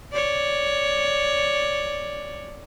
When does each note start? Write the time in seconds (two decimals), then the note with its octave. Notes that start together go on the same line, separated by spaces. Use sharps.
0.12 C#5 D5